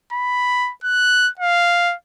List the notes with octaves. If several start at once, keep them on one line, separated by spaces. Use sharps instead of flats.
B5
F#6
F5